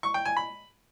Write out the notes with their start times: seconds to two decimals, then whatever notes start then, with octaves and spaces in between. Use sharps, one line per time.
0.03 C#6
0.14 G5
0.25 G#5
0.37 B5